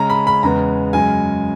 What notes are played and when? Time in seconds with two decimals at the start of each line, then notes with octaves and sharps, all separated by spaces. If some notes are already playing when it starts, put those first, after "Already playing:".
Already playing: C#3 G#3 C#4 A#5
0.10 B5
0.27 B5
0.43 E2 C#3 G#3 B3 A#5
0.93 F#2 C#3 G#3 G#5